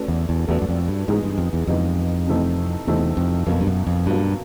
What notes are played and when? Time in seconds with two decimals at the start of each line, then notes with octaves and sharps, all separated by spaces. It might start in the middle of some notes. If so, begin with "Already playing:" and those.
Already playing: A3 C#4 F#4 B4 D5
0.08 E2
0.29 E2
0.48 E2 A3 C#4 F#4 B4 D5
0.62 F#2
0.69 F2
0.88 G2
1.08 G#2 E3 G#3 B3 D#4 G#4
1.23 G2
1.38 F2
1.53 E2
1.67 F2 E3 G#3 B3 D#4 G#4
2.27 C3 E3 A3 C4 D#4
2.87 E2 C3 E3 A3 C4 D#4
3.17 F2
3.47 F2 B2 F#3 A#3
3.61 G2
3.67 F#2
3.87 F2
4.06 G2 B2 F#3 A#3